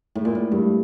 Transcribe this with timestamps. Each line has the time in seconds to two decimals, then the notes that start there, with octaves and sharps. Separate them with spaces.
0.15 A2
0.25 A#2
0.35 A2
0.52 G2